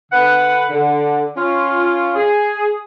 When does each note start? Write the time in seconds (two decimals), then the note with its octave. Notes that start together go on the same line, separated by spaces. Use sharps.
0.11 D3 B4 F#5
0.70 D3
1.36 C#4 F4
2.16 G#4